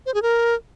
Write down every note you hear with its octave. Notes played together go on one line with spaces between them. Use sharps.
C5
G#4
A#4